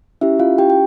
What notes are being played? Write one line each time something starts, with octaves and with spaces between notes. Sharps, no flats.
C#4 E4 G4 E5
F4 F5
G4 G5
G5